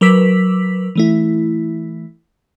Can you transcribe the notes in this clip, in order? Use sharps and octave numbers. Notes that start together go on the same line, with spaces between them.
F#3 A#4 B4 D6 E6 B6
E3 A3 E4